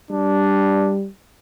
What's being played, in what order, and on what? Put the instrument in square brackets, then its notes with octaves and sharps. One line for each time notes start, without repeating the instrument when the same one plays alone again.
[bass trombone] G3 [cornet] D4